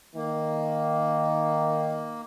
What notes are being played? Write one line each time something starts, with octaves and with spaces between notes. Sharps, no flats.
D#3 A#3